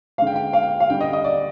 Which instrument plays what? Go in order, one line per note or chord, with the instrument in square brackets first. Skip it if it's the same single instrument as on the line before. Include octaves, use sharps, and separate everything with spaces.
[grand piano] G#3 F5
D3 G5
G5
F5
G5
F5
D3 G3 G5
D#5
D#5
D5